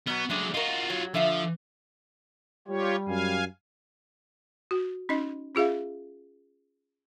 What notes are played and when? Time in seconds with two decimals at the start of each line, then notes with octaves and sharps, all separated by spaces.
0.07 B2 F#3 B3
0.30 F#3 G#3 A3 D4 G#4
0.54 F4 F#4 A#4 D#5
0.90 F#3
1.14 D3 F3 E5 F5
2.68 G3 F4 G4 C#5
3.08 F#2 F5 G#5
4.71 F#4
5.09 C#4 D#4 D#5
5.55 C#4 F4 G#4 E5 F5